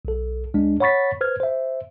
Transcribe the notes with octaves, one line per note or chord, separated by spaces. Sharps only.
B1 A4
D2 G#3 D4
C#5 F#5 B5 C#6 A6 B6
B4 C5 F6 G#6
C5 E5